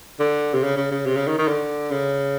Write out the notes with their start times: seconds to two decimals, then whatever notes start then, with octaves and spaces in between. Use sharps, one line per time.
0.20 D3
0.54 C3
0.63 C#3
0.77 C#3
0.91 C#3
1.06 C3
1.17 C#3
1.28 D#3
1.38 D#3
1.48 D3
1.91 C#3